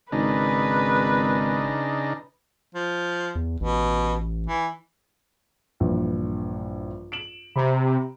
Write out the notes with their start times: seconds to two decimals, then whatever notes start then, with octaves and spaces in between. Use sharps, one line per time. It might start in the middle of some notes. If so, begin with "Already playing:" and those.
0.12 G#1 C#3 D4 D#4 B4
2.75 F3
3.35 E2
3.60 A1 B2
4.47 E3
5.80 A#1 G2 E3
7.12 D7 E7 F#7
7.56 C3 A#5 B5